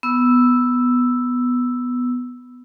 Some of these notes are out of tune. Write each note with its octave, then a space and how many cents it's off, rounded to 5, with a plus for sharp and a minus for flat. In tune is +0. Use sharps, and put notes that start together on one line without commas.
B3 +0 E6 +0